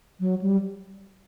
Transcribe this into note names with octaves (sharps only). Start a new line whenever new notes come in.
F#3
G3